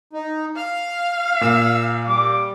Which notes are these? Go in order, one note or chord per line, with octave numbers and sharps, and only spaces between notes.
D#4
F5 F6
A#2 E6
G3 D6